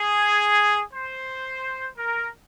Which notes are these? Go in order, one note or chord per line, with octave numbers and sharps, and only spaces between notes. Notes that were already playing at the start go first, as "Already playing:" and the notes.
Already playing: G#4
C5
A#4